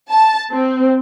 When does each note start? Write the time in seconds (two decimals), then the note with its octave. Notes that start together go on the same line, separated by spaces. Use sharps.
0.10 A5
0.51 C4